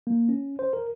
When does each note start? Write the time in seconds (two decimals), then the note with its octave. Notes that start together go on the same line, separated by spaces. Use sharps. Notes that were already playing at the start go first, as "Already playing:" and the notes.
0.07 A#3
0.29 C#4
0.59 C5
0.73 A#4